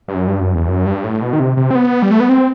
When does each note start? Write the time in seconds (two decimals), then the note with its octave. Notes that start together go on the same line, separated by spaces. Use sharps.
0.08 G2
0.14 F#2
0.27 G2
0.40 F#2
0.54 E2
0.68 F#2
0.85 G2
1.04 A2
1.22 B2
1.33 D#3
1.40 C3
1.57 C3
1.71 C4
1.75 B3
2.02 G3
2.11 A3
2.20 B3
2.29 C4